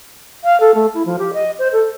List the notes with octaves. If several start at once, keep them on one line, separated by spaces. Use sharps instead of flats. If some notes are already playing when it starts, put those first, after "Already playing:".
F5
A4
A3
E4
F3
G4
D#5
C5
A4